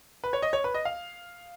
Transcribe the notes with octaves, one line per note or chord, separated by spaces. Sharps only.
B4
C#5
D#5
C#5
B4
D#5
F5